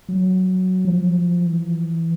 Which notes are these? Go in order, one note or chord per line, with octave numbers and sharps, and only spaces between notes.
F#3
F3
E3